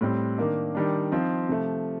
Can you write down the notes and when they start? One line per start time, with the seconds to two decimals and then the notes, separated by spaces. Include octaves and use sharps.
0.01 A2 G3 C4
0.38 D#3 A#3 D4
0.75 D#3 G3 D4
1.11 F3 C4 D#4
1.49 C3 F3 A3